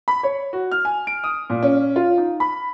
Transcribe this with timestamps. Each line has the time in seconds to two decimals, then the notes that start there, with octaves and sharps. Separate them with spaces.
0.08 B5
0.23 C#5
0.53 F#4
0.71 F6
0.85 G#5
1.07 D7
1.24 D#6
1.50 A#2
1.63 C#4
1.96 F4
2.18 D#4
2.40 B5